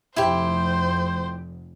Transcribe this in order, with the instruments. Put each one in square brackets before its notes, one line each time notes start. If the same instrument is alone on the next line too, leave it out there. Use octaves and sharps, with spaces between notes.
[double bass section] F1 [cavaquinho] E4 G4 [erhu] C5